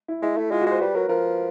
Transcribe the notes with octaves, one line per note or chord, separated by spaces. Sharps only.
E4
G#3 E4
A3 E4
G#3 F4
F#4
G#3 C5
G3 B4
F#3 A#4
F3 A#4